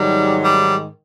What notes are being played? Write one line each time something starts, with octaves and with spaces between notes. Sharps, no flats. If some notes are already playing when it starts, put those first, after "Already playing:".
Already playing: G#2 D#3 F#3 G3
G3